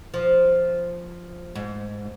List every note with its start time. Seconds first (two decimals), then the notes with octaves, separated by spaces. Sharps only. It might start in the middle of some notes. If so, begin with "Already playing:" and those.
0.14 F3
1.55 G#2